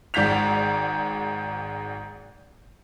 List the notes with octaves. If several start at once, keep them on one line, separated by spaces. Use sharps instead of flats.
G#1 G#2 D5 G6 B6 F7